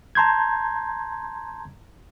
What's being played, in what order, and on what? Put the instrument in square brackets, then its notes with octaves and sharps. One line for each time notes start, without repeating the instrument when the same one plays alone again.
[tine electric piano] A5 A#5 C6 G6 G#6